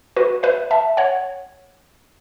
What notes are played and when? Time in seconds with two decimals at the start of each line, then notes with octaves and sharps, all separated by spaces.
0.17 F#4 B4
0.43 B4 E5
0.71 E5 A5
0.97 C#5 F#5